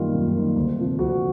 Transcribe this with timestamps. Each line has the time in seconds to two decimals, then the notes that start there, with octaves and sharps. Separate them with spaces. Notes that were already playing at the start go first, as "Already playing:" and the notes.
Already playing: F#2 D#3 G3 A#3 D#4 F4
0.13 F#2
0.35 D#3 G3 A#3 D#4
0.56 D2
0.77 C3 F3
0.98 D2 F#4